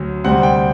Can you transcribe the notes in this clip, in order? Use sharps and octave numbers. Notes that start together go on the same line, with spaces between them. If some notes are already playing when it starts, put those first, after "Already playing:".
Already playing: D2 F#3
D2 C3 G3 C4 F#5
G5